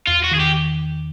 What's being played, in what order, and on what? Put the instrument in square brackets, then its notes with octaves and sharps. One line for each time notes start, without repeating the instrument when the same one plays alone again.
[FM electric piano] E2 [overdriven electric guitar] F4
[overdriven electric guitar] F#4
[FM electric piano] D#3 [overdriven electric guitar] G#4
[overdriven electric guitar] G4